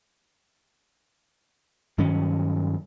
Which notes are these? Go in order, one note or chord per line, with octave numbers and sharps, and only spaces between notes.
G2 D#3 F#3 C#4